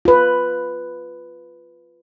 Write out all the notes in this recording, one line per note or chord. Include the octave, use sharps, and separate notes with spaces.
F4 B4